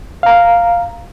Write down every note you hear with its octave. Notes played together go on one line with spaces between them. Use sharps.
F5 A#5